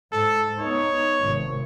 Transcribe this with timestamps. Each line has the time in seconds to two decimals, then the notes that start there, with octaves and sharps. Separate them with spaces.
0.12 G#2 A4
0.59 B3 D#4 C#5
1.21 G#1 C3